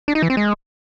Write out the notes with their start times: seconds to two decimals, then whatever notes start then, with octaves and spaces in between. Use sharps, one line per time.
0.08 D4
0.15 D#4
0.22 E3
0.30 C4
0.37 G#3